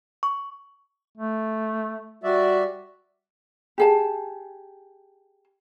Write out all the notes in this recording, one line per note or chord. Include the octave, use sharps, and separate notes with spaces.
C#6
A3
G3 F#4 D5 E5
G4 G#4 A5